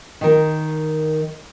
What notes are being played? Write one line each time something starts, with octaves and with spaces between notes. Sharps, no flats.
D#3 A#4